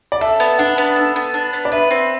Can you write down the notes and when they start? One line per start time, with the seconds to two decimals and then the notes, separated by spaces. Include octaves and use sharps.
0.12 D5
0.21 A4 E5
0.40 B3
0.59 D4 F#5
0.78 B3
0.96 A4
1.16 B3
1.34 D4
1.53 B3
1.65 D5
1.72 B4 E5
1.91 C4